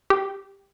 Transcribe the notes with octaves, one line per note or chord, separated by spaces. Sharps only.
G4